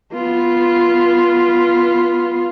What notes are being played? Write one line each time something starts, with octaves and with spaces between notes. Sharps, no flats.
B3 F4